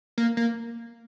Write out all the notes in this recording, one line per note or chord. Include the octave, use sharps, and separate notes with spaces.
A#3
A#3